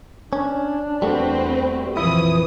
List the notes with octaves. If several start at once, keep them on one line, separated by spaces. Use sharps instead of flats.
C#4 D4
E2 G3 A3 C4 F#4 B4
A#1 F2 E3 F3 E4 D#6